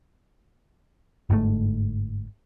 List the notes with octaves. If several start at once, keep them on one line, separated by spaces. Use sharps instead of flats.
G1 G#2 D3 A3